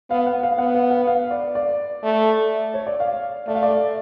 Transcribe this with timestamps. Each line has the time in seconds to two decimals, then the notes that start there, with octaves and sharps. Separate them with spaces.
0.10 B3 F5
0.26 F#5
0.43 F5
0.58 B3 F#5
0.74 F5
0.90 F#5
1.07 F5
1.31 D5
1.55 D5
2.04 A3
2.74 C#5
2.86 D5
3.00 F5
3.47 A3 D5
3.55 F5
3.63 D5